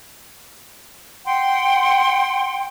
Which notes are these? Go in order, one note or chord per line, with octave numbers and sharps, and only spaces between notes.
F#5 G5 C6